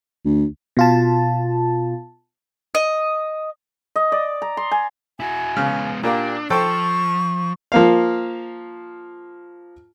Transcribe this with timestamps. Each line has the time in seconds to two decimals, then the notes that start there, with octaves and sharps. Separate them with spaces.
0.25 D2
0.77 B2 F4 A5
2.75 D#5
3.96 D#5
4.12 D5
4.42 A#5
4.57 C6
4.72 G#5
5.20 E4 F#4 G#5
5.56 C#3 G#3 B3
6.03 A#2 A#3 D4 G4
6.50 F3 A4 C5 G5 C#6
7.72 F3 A#3 F5